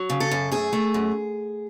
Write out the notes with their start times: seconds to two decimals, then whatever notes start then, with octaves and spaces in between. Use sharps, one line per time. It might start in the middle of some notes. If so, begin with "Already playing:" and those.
Already playing: F#3
0.10 C#3
0.20 A4
0.31 F#2
0.52 A3 G#4
0.73 A3
0.94 F#2